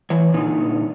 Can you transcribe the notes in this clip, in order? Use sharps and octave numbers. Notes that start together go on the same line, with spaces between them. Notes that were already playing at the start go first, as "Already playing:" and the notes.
E3 C#5
A#2 D3 D#4